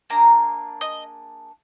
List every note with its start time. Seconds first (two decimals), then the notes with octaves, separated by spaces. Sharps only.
0.10 A#3 D4 G#4 A#5
0.81 D#5